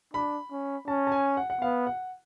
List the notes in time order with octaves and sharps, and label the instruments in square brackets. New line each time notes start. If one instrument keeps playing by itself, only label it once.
[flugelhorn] D4 [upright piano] B5
[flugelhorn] C#4
[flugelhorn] C#4 [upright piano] A5
[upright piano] A5
G#5
F#5
F#5
[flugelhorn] B3 [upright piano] F5
[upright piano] F#5